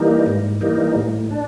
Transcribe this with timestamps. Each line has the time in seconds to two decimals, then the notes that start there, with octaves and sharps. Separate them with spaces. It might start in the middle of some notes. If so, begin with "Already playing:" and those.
Already playing: E3 G3 A#3 D#4
0.26 G#2
0.61 E3 G3 A#3 D#4
0.96 A2
1.31 D4